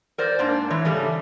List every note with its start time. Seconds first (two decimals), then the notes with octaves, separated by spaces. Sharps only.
0.18 A#4 C5 D5
0.39 G#2 A#3 D4
0.70 G#2 E3 C#5
0.85 C#3 G3 A3